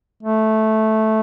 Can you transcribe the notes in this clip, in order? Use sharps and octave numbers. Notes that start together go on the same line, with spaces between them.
A3